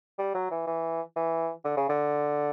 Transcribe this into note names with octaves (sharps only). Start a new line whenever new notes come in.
G3
F#3
E3
E3
E3
D3
C#3
D3